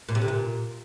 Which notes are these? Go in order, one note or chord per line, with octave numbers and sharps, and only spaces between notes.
A#2
C3
D3
A#2